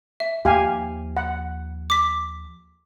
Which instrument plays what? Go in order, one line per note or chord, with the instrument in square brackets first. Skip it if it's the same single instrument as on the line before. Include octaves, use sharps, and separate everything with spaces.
[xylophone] E5
[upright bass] D#2 F3 [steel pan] G4 F5 G#5
[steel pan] F#5
[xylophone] D6 B6